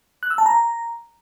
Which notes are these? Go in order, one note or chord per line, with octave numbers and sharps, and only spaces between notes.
F#6
E6
A5
A#5